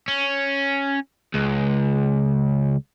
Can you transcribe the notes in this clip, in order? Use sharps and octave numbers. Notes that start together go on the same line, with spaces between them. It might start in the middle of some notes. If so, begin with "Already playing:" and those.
C#4
C#2